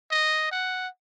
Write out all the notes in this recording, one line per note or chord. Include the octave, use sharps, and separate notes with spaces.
D#5
F#5